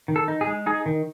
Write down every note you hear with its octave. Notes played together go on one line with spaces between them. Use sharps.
D#3
A4
D#4
G#4
G#3
D#4 G#4
D#3